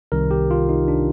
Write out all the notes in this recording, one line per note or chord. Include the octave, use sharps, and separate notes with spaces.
C2 C3 D#3 A#4
G4
F4
D#4
D4